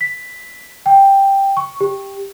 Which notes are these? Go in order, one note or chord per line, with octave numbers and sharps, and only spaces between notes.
B6
G5
C#6
G4